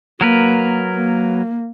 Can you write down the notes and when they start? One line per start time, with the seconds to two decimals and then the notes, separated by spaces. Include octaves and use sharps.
0.21 F#3 A#3 A#4 B4
0.96 A#3